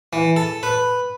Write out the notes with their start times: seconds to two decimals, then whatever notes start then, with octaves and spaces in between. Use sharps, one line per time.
0.13 E3
0.36 A4
0.63 B4